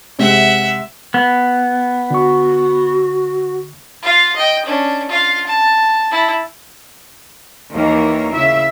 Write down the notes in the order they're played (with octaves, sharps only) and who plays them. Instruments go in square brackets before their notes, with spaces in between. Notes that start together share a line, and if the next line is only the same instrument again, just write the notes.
[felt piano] C3 G#3 [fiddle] E5 F#5
[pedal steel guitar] B3
[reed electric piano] D3 C#6 [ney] F#4
[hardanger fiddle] F4 F5
D#5 G5
C#4 D4
F4 F5
A5
E4 A5
[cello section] D#2 D#3 E3 A#3 A#4 C#5
C#3 E4 E5